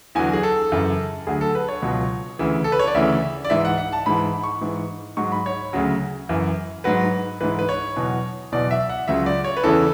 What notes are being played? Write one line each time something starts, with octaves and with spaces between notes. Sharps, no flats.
E2 D3 F#3 G#5
G#4
A4
F#2 C#3 E3
D2 D3 F#3 G#4
A4
B4
C#5
C#2 B2 F#3
D2 C#3 E3
A4
B4
C#5
D5
D2 C#3 E3 E5
D5
G#2 E3 E5
F#5
F#5
A5
G#2 E3 B5
C#6
G#2 E3
G#2 F#3 C#6
B5
C#5
D2 C#3 F#3
F#2 E3
G#2 F#3 B4
G#2 E3 B4
B4
C#5
E2 B2 F#3
E2 B2 F#3 D5
E5
F#5
C#2 C#3 F#3 E5
D5
C#5
B4
E2 C#3 E3 A4